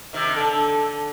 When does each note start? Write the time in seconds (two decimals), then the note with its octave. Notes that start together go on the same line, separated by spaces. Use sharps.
0.13 C3 D#3
0.37 D3 A4